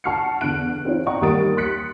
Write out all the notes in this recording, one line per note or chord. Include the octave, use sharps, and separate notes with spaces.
F#5 A5 C#6 F6 C7 C#7
E2 D3 F#6 D7
C4 D#4 F4 C#5
D5 D#5 F#5 G5 A#5 C#6
D#2 G3 A#4 D#6 A6 D7
C6 F#6 B6 C#7